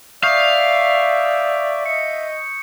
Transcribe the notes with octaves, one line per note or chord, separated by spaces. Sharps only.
D5 E5 F5 C#6 D#6 G6
D#5 C#7